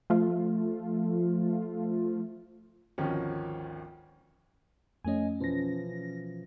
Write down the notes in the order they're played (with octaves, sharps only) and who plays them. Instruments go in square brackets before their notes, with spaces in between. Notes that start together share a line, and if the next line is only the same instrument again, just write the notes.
[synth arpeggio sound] F3 A3 F4
[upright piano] G#1 D2 D#3 F3 C#4 F#4
[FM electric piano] F2 A3 C#4 [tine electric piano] D#5 G#5
[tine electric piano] B2 E3 F3 [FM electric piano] C#4 A#6